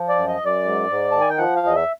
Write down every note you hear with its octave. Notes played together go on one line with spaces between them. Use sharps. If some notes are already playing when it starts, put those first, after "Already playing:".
Already playing: F3
D5
F#2
D#5
F#2
D5
G#2
G#2
D#3 A5
G#5
G5
F3 F#5
F5
E2 D#5
E5